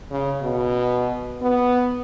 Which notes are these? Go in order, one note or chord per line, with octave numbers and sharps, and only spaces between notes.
C#3
B2
B3